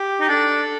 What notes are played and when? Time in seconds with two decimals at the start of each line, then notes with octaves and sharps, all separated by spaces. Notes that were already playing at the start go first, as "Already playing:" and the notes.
Already playing: G4
0.20 D#4
0.29 D4 A4